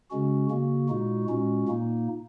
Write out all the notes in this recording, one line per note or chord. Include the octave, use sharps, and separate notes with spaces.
C#3 G#3 C#4 F#4
C#3 A#3 F#4
A#2 G#3 D#4 F#4
A#2 G#3 C#4 F#4
A#2 A#3 D#4